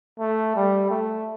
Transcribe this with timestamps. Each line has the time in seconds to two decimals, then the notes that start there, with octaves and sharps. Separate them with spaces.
0.19 A3
0.55 G3
0.90 A3